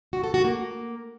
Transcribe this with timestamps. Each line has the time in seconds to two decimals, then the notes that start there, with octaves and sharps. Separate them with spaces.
0.13 F#4
0.24 A4
0.34 F#4
0.45 A#3